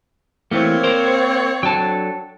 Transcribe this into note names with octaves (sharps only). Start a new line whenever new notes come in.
E3 A3 A#3 C4 C#5
A#4 C5
F#3 D4 A4 G5 A5